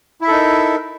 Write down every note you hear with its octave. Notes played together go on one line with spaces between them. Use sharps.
D#4 E4 A4 A#4 E5